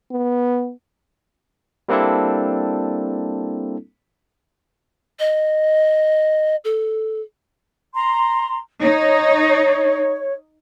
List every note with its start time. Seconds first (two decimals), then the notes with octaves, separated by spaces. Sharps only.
0.11 B3
1.88 G3 A#3 C4 D4 E4 A4
5.19 D#5
6.65 A4
7.93 A#5 C6
8.82 D#4 C#5